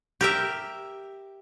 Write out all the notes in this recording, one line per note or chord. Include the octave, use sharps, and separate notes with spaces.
G4 A#4 E5